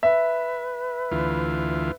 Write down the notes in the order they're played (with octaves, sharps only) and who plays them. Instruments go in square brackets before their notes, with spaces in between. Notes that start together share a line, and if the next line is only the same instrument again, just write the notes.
[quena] B4 [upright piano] E5
[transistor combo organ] D2 E3 F4